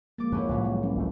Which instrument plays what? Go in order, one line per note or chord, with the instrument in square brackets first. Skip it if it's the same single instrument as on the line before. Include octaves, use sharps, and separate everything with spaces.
[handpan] F3 G#3 A#3 [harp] D6 A6
[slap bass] F2 [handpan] F3 [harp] B3 C#4 E4
[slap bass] C2 [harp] A2 E3 F#3
[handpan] G#3 C4
C#4
[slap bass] G#1 D2 A3